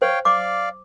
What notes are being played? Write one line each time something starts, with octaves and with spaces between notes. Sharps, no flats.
C5 C#5 F5 G5
D5 F5 D6